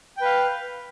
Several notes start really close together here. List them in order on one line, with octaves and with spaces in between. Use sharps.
G5 B4 F5